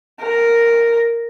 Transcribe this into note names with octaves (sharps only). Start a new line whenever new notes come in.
A#4